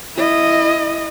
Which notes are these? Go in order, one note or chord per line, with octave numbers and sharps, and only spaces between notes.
E4 D#5